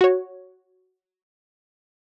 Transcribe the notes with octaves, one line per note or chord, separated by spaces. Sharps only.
F#4 C#5